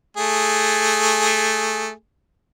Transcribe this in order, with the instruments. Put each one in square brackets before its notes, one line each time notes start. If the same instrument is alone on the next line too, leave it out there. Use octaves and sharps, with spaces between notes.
[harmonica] A3 G#4